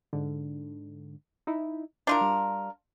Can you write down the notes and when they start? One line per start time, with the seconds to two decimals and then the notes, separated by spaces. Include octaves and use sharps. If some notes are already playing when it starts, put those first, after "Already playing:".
0.13 G#2 D3
1.47 D#4 E4
2.07 D4 E4 F4 A#4 G6
2.21 G3